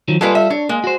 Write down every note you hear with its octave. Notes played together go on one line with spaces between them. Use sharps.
D#3 F3 F#3
G3 G#3 A#3 F4 A4 B4
E5
D4 C#5
G#3 A#3
F#4 C5